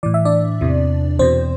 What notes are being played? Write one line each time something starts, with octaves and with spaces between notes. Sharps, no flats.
A2 E3 D5
E5
D4 D5
E2 C3 E3
E2 B2 C4 C5